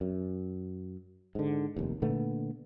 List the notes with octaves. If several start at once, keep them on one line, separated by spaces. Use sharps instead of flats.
F#2
G#2 D3
F1 D#2
A#2 D3 A3 B3